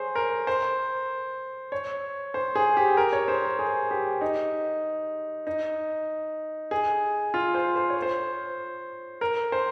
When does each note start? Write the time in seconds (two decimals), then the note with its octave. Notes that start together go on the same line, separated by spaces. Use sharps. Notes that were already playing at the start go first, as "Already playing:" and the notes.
Already playing: G#4 C5 C#5
0.15 A#4
0.47 C5
1.72 C#5
2.34 C5
2.55 G#4
2.77 G4
2.97 A#4
3.13 C#5
3.28 C5
3.44 A#4
3.59 G#4
3.91 G4
4.21 D#4
5.47 D#4
6.71 G#4
7.34 F4
7.54 C5
7.76 C5
7.90 C#5
8.02 C5
9.21 A#4
9.52 C5